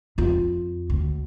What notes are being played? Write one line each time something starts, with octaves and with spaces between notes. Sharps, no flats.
F2 F4
D2